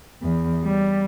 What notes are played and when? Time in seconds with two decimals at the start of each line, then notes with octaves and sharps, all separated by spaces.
0.22 E2
0.63 G3